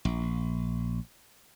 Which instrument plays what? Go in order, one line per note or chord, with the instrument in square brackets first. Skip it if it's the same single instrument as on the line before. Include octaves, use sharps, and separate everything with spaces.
[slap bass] A#1